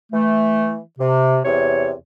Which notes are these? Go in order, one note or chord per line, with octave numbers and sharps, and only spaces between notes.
E3 A3
C3
E2 C3 C#5